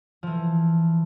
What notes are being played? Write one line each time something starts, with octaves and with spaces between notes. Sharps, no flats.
E3 F3